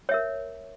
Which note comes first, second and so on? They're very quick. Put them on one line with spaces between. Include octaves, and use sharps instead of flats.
C#5 E5 A#4